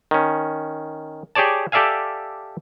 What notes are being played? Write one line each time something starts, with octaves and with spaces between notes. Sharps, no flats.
D#3 C#4
G4 G#4 C#5 D5 A5
G4 A4 D5 E5 F5 G#5